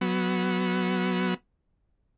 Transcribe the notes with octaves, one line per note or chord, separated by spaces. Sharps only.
F#3 B3